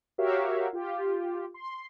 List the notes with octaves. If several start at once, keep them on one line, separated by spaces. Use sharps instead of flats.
F#4 G4 A#4 C#5 E5 F5
F4 G4
C6